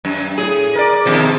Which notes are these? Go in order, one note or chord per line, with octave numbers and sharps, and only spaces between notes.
F#2
A2 G#4
A#4 D5
B2 D#3 F3